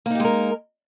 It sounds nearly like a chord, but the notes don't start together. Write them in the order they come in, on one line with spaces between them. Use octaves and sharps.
A#3 D#4 G4 G#3 A#4